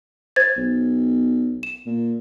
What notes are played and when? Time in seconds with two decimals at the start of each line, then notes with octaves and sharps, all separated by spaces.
0.36 C5 G#6 A6
0.57 B1
1.63 E7
1.86 A#2